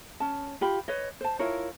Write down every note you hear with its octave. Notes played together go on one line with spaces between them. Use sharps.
C#4 A5
F4 G4 B5
B4 C#5 D#5
C5 A5
E4 F4 A#4 C#5